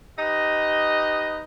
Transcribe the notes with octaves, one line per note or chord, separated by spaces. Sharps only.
D#4 G4 B4 D#5